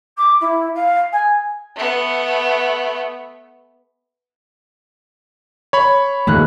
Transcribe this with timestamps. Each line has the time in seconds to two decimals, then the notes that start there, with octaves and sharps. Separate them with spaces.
0.17 D6
0.41 E4
0.75 F5
1.12 G#5
1.76 A3 B3
5.73 C#5 B5
6.27 D#1 A3 A#3 F#6